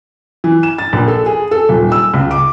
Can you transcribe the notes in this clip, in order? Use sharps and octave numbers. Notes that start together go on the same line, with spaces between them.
E3
E7
A6
A#1
A4
G#4
A4
D#1
E6
C#2
D6